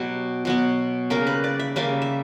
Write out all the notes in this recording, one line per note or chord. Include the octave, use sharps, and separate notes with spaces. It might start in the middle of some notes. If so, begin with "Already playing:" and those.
Already playing: B2 F#3 B3 G4
B2 F#3 B3
C#3 G3 A#3 A#4
B4
D5
E5
C#3 G3 A#3 E5
E5